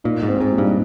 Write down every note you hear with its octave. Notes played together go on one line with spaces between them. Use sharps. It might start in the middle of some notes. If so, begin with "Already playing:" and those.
A#2 D#4
G#2
C4
G#2
A#2
G2